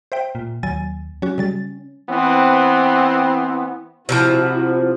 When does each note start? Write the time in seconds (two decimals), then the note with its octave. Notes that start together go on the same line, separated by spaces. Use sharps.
0.12 C5 E5 G5
0.35 A#2
0.63 D#2 F#3 G#5 A6
1.22 F#3 C#4 F#4
1.38 C#3 G3 A6
2.09 E3 B3 C4
4.09 C3 D#3 F3 E4 F#4